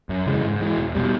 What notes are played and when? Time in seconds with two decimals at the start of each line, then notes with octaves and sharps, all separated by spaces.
0.09 F#2
0.27 C#3 E3 G#3
0.43 G#2
0.61 E3 G#3
0.78 E1
0.95 B2 G3